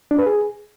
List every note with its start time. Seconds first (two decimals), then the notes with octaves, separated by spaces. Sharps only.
0.11 D4
0.19 B4
0.26 G#4